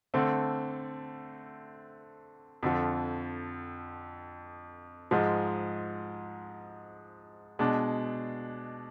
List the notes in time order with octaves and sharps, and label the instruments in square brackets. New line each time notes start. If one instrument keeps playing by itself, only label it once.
[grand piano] D3 A3 C4
F2 D3 F3
G#2 F3 G#3
B2 G#3 D4